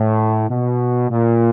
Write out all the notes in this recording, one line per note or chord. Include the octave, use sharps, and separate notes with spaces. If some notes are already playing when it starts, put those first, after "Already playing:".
Already playing: A2
B2
A#2